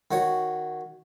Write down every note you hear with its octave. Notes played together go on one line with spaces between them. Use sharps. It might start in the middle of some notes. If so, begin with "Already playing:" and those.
D#3 F#4 C#5